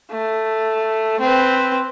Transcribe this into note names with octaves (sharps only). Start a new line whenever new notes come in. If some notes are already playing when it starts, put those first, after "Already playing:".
A3
C4 B4